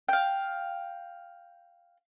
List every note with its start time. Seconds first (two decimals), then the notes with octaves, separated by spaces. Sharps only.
0.09 F5 G5